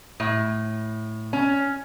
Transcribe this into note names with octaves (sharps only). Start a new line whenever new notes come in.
A2
C#4